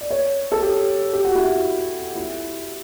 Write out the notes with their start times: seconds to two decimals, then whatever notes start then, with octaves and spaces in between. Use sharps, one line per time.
0.01 D5
0.11 C#5
0.52 A4
0.62 G4
1.13 G4
1.25 F#4
1.35 E4
1.45 F#4
2.15 E4